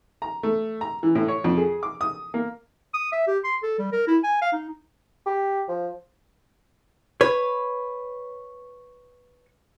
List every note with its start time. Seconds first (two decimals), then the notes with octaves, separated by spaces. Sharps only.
0.22 A#5
0.43 A3
0.81 A#5
1.03 E3
1.15 A2
1.28 C#5
1.44 F2
1.57 G#4
1.83 D6
2.01 D#6
2.34 A#3
2.94 D#6
3.12 E5
3.27 G4
3.44 C6
3.63 A4
3.79 G3
3.92 A#4
4.07 E4
4.23 G#5
4.41 F5
4.53 D#4
5.26 G4
5.68 F3
7.21 B4 C#5